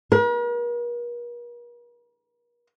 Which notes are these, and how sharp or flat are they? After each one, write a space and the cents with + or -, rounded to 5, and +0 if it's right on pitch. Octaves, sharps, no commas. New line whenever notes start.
A#4 +45